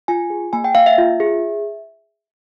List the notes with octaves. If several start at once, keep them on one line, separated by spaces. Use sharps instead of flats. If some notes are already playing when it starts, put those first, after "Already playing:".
F4 G#5
G#4
A#3 G#5
G5
A#3 F5
E5
F4
G#4